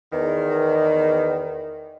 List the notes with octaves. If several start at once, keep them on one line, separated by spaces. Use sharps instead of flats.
E2 D#3